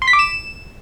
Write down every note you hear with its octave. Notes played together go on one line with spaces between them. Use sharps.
C6
B6
D6
E7